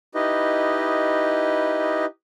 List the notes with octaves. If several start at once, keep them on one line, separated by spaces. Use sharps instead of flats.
D#4 E4 G4 B4 D#5